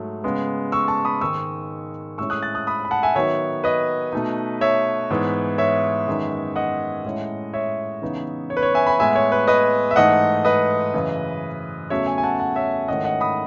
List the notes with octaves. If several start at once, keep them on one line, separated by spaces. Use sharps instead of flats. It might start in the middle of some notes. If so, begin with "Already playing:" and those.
Already playing: G#2 F#3 A3
C#3 G#3 B3
C#6 E6
A5 C#6
B5 D#6
G#2 D#3 G#3 C#6 E6
A2 G#3 C#4 E4 C#6 E6
D#6 F#6
F#6 A6
D#6 F#6
B5 D#6
B5
F#5 A5
E5 G#5
D#3 F#3 B3 D#4 C#5 E5
B4 D#5
B2 A3 D#4
C#5 E5
G#2 E3 B3 E4
C#5 E5
F#2 D#3 G#3 B3 D#4
D#5 F#5
A2 G#3 C#4 E4
C#5 E5
C#3 E3 B3 D#4
C#5
B4
C#5
E5 G#5
G#5 B5
A2 G#3 B3 E5 G#5
C#5
B4
B4 D#5
E5
G#2 E3 A3 D#4 D#5 F#5
B4 D#5
F#2 C#3 E3
E2 C#3 F#3 A3 C#4 C#5 E5
E5 G#5
G#5
F#5 A5
F#5 A5
C#5 E5
G#2 D#3 A3 C#4 E4 D#5 F#5
D#5 F#5
B5 D#6